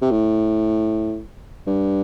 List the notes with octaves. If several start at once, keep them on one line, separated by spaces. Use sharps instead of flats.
C3
A2
G2